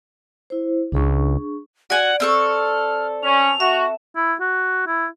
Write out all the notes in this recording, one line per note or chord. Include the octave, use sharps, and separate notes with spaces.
E4 C5
C#2 D4 G#4 C#6
F#4 D5 F#5 G#5
C4 A4 C#6 F6
C#4 F7
F#4 E5
E4
F#4
E4